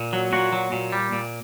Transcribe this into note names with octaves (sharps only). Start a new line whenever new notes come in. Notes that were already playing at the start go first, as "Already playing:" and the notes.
Already playing: A#2
F#3
A#2 F#4
F#3
A#2
G3
A#2